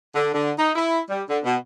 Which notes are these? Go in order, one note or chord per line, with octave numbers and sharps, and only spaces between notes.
D3
D3
D#4
E4
G3
D3
B2